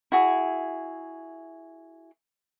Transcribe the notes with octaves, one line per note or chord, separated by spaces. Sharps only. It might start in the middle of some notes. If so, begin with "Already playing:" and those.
E4 F#4 G#4